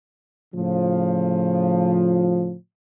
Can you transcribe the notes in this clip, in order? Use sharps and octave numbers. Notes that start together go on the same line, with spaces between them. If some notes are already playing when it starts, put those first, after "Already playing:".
A2 C#3 F3